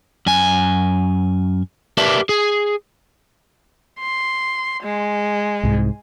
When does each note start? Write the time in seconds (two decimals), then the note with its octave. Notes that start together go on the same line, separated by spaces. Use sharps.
0.26 F#2 G#5
1.97 G4 A#4 B4 D5 E5 A5
2.29 G#4
3.99 C6
4.83 G#3
5.63 C2 G#2